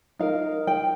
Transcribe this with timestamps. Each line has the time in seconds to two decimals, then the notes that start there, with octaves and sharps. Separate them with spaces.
0.19 D#4 A#4 F5
0.67 G5